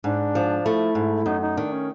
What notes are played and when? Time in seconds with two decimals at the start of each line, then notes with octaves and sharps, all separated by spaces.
0.04 G#2 D4
0.35 F3
0.65 A3 E4
0.95 G#2
1.26 F#2 D#4
1.41 D#4
1.57 D#3 D4
1.72 C#4